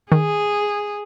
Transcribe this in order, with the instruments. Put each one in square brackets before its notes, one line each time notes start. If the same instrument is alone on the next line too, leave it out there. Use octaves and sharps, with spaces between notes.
[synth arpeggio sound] D#3 [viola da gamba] G#4